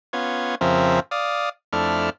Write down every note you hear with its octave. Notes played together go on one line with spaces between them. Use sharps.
B3 C#4 F4 G#5
F2 C#3 F3 C4 A#4 E5
D5 F5 D#6
F2 A3 D4 E4 F6